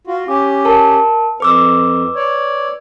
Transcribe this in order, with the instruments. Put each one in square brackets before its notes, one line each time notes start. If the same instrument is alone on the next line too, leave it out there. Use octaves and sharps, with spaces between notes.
[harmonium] F4 F#4
[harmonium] C#4 G4 [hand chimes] D6
[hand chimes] A#4 A5
[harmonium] F2 [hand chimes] B4 D6 E6
[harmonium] C#5 D5